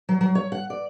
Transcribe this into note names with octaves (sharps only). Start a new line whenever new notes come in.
F#3
F#3
C#5
F#5
D5